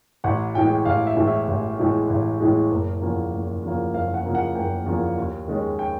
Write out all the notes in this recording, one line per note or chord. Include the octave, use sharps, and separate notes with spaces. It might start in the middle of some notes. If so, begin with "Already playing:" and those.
A1 F#5
A2 E3 G#3 G5
A1 F5
E5
A2 E3 G#3
E5
A1
A2 E3 G#3
A1
A2 E3 G#3
F#1
E2 C#3 F3 A#3
F#1
E2 C#3 F3 A#3
F#1 F5
F#5
E2 C#3 F3 A#3
F#5
F#1 G5
E2 C#3 F3 A#3
D#2
D#3 G#3 C#4
G5